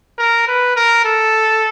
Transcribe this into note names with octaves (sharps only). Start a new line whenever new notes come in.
A#4
B4
A#4
A4